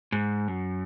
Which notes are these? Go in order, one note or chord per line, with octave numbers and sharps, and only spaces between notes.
G#2
F#2